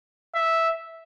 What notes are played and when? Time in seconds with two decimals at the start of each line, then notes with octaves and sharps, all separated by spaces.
0.35 E5